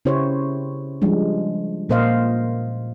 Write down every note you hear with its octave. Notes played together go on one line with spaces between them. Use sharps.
C#3 E4 G4 C5 C#5
F3 G3 G#3 D4
A#2 A#3 C5 D#5 F5